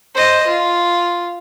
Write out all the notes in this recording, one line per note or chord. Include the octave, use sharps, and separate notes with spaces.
C5 D#5
F4